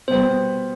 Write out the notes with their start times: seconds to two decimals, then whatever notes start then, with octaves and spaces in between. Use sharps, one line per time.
0.08 B2 G3 B3 C5